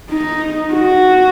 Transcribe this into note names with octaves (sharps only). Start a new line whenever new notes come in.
D#4
F#4